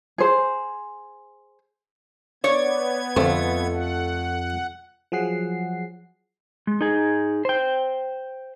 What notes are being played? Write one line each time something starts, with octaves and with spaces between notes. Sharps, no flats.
G#4 C5
B3 C#5 D5 G#6
F2 D3 F3 A3 C4
F#5
F3 F#3 G#4 F#5 C7
G#3
D#4 G#4
C5 G5